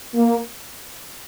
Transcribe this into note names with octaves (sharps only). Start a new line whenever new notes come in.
A#3